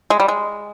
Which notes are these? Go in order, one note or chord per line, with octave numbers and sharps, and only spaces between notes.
G#3
G3
G#3